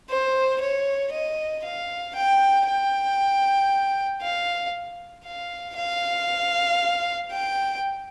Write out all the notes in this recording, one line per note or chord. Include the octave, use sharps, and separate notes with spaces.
C5
C#5
D#5
F5
G5
G5
F5
F5
F5
G5